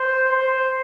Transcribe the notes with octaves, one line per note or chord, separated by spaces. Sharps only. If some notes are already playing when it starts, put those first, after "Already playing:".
Already playing: C5
C5